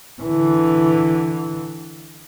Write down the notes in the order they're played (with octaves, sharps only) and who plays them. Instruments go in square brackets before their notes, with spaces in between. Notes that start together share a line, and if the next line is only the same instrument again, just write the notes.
[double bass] D3 E3